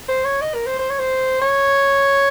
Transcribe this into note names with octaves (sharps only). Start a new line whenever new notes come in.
C5
C#5
D#5
A#4
C5
C5
C#5
C5
C#5